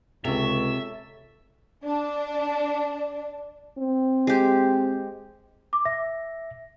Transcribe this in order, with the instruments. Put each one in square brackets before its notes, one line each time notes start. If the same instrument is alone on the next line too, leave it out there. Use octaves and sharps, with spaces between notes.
[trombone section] C#2 [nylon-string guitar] C3 [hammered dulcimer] A4 C#5 [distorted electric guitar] E5
[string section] D4 [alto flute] D5
[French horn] C4
[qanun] G#3 G4
[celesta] D6
[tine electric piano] E5 [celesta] A#6